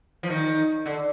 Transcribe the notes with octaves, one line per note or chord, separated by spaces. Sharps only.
F3
D#3
D3